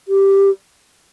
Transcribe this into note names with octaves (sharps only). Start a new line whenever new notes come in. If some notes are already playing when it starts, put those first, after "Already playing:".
G4